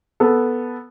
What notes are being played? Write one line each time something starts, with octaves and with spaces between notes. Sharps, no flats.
B3 A4